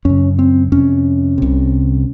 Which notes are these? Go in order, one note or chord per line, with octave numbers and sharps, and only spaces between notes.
F#2 C#3 C#4
C4
F2 C3 C#4
C2 C3